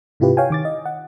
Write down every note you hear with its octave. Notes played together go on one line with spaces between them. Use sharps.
G#2 C3 E4 F4 G4 B4
C#5 F5 G5 G#5
D#3 D6 A6
D#5
F#5